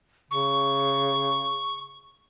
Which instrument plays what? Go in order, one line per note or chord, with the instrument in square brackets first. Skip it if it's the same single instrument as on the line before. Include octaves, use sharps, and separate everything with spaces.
[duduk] C#3 [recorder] C#6